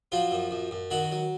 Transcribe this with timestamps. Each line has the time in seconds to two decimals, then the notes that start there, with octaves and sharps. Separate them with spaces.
0.12 F3 F#3 F4
0.31 F#2
0.51 F#2
0.71 F#2
0.91 D#3 F#3 F#4
1.11 F#3